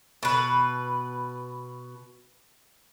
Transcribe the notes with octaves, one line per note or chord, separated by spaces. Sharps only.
B2 B4